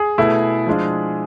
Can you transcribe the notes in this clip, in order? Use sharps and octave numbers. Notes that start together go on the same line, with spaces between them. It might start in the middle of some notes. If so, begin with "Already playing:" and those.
Already playing: G#4
B2 A3 E4
F3 G#3 D4 F4